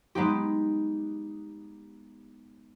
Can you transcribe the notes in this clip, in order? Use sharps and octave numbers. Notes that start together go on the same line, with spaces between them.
G#3 B3 D#4 G4